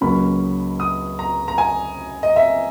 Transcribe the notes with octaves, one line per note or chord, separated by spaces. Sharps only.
C#2 C#3 F#3 A#3 C#4 B5
D#6
A#5
A#5
G#5
D#5
E5